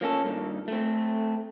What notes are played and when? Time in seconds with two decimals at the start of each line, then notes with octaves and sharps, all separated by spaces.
0.01 F3 A#3 C#4 A4
0.24 G2 A#2 D#3
0.68 A3 C4